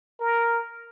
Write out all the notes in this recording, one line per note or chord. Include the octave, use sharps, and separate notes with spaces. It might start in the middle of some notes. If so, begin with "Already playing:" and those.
A#4